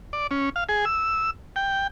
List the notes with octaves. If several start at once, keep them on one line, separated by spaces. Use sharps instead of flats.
D5
C#4
F5
G#4
E6
G5